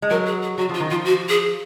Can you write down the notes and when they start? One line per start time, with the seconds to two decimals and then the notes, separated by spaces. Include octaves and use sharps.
0.02 G#3
0.10 F#3 A#4
0.26 G#4
0.43 G#4
0.57 F#3 F#4
0.69 F3 F4
0.80 D#3
0.90 F3 F4
1.05 F#4
1.29 G#4